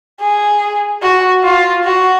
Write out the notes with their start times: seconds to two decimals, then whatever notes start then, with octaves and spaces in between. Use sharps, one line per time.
0.21 G#4
1.02 F#4
1.43 F4
1.84 F#4